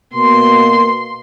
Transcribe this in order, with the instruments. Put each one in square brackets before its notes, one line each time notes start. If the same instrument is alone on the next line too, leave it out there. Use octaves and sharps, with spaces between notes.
[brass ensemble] B2 [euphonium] A#3 [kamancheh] C6